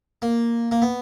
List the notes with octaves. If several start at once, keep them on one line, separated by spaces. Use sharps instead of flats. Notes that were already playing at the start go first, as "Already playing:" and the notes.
A#3
A#3
B3